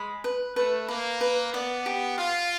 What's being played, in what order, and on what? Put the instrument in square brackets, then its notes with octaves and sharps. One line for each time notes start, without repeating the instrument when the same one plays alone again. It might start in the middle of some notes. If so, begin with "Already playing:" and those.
Already playing: [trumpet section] G#3 [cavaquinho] B5
[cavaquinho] B4
[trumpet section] A3 [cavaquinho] B4
[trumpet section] A#3 [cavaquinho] B4
[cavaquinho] B4
[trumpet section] B3 [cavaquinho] D5
[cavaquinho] G4
[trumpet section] F4 [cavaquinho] F5